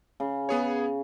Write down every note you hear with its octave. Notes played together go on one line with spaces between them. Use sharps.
C#3
B3 G#4 C#5